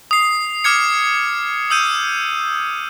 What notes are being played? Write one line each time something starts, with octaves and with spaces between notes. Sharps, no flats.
D#6 C7
D6 F6 G#6 C#7
D#6 E6 G6 D#7